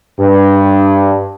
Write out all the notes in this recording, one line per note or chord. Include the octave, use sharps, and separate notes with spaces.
G2